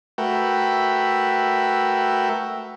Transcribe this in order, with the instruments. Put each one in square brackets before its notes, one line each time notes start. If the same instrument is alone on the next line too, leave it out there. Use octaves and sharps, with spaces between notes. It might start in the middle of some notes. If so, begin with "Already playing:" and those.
[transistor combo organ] A3 F#4 A#4 B4 E5 G5